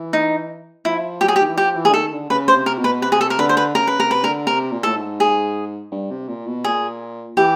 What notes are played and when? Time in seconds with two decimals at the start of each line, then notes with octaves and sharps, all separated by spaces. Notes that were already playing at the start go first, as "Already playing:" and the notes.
Already playing: E3
0.13 D#4
0.85 F3 E4
1.21 F#3 G4
1.28 G#4
1.36 G4
1.41 D#3
1.49 E3
1.57 F3 G4
1.76 E3
1.85 G#4
1.89 D3
1.94 D#3 A4
2.12 D3
2.30 C#3 B4
2.48 C5
2.54 C3
2.66 A#4
2.78 B2
2.84 B4
3.02 C3 B4
3.12 G#4
3.21 A4
3.30 A#4
3.39 D3 B4
3.49 C5
3.57 B4
3.75 C#3 A#4
3.87 B4
3.98 C3 A#4
4.11 B4
4.23 D3 A#4
4.47 C3 A#4
4.72 A#2
4.83 A2 A4
4.95 G#2
5.20 G#4
5.92 G2
6.11 C3
6.28 A#2
6.47 B2
6.64 A#2 G#4
7.37 E3 G4